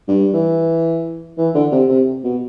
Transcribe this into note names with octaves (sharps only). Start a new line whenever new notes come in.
G2
E3
E3
D3
C3
C3
B2